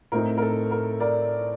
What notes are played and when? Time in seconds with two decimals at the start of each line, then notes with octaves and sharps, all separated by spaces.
0.12 A2 A3 C4 D#4 A#4
0.38 A#4
0.42 A4
0.71 A#4
1.00 A#4 D5